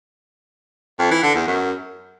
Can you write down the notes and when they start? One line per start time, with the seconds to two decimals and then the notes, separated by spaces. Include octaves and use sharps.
0.99 F2
1.11 E3
1.23 D3
1.35 E2
1.47 F#2